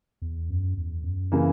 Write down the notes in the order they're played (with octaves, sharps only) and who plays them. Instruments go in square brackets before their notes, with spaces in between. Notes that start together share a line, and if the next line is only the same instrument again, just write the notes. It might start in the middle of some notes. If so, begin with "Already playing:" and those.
[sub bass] E2
F#2
E2
F#2
[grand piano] C#3 E3 A#3